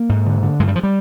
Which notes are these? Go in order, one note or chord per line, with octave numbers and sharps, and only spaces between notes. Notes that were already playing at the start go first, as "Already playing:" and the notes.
Already playing: A#3
G#2
D3
D3
G2 G#3
G3
F3
G3